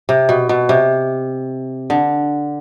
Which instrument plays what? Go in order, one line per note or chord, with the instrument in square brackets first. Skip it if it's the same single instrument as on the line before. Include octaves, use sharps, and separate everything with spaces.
[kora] C3
B2
B2
C3
D3